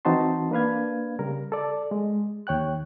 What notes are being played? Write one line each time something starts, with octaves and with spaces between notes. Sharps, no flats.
E3 C4 D#4 F#4 A5 C6
A#3 D4 B4 F5 G#6
C#3 G3 A#4
A4 D5
G#3
D#2 C#5 G5 F#6